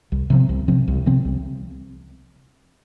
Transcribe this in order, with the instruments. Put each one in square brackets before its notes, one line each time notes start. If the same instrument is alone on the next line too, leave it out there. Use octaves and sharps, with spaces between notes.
[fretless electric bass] C2
C3 F3 C4
C2
C3 F3 C4
C2
C3 F3 C4
C2